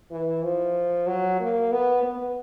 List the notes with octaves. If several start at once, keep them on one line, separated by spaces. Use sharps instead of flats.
E3
F3
F#3
A#3
B3
B3